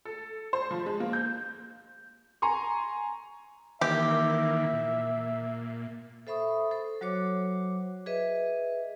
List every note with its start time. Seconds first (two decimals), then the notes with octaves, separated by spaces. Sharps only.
0.05 A4
0.53 C5
0.71 F3
0.86 G#3
1.00 A#3
1.13 G6
2.42 G#5 A#5 C6 C#6
3.81 D#3 E3 A#3 G4 E5
4.73 A#2
6.27 A4 C5 E5 B5 C#6 D#6
6.71 A4 C5
7.01 F#3 F#4 C5 C#5 D6
8.06 G#4 B4 D#5 E5